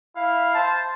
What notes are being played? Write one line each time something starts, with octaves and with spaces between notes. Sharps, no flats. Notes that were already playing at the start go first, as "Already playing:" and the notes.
E4 F5
C5 A5